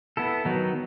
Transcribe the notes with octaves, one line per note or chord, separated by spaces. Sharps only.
B3 E4 A4
D#3 F#3 B3 D#4